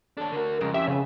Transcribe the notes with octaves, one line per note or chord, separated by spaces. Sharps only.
D#2 D4 A4 C#5
D3 F#4 A#4
F2 C#3 G#3 A#4
F3 C#4 E4 G4 E5
C#3 B3 B4